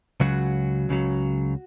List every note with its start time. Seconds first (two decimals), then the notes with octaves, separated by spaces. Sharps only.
0.20 C#2 C#3 F#3 F#4
0.89 C#2 C#3 F#3